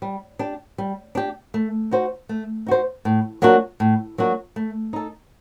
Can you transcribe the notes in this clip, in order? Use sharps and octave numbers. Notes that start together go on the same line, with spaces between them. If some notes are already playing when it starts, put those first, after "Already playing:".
G3
D4 G4
G3
D4 G4
A3
D#4 F#4 C5
A3
D#4 F#4 C5
A2
F#3 A#3 D4 F#4
A2
F#3 A#3 D4 F#4
A3
D#4 A4